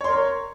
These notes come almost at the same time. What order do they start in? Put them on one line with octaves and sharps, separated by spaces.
C#5 C6 A#4